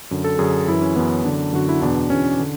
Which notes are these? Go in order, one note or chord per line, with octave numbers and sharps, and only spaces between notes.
F#2 D3
A4
F#2 D3 G#4
F#2 E3 E4
C#4
F#2 E3 B3
F#2 D3 D4
F#2 D3 F#4
E4
E2 B2 D4
E2 B2 C#4
D3